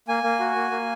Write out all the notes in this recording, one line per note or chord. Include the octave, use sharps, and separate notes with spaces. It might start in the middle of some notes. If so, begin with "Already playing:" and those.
A#3 G#5
A#3
F#4
A#3
A#3